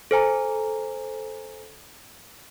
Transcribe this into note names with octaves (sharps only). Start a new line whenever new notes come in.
A4 C5 G#5 A#5